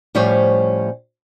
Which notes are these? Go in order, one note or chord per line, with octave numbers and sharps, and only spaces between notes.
A2 F3 G3 C#4 C5 C#5